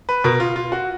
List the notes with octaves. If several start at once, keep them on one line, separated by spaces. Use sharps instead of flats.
B4
B2 A#4
F4
F4
F#4